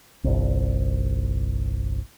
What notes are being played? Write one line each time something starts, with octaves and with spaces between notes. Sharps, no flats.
G1 C2